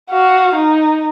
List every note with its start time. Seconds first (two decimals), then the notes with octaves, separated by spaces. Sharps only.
0.11 F#4 F5
0.55 D#4